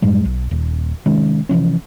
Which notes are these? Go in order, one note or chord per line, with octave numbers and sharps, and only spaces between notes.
F#2 A2 G3 G#3
B1
D#1
C3 D#3 G#3 C#4
C3 E3 F3 C#4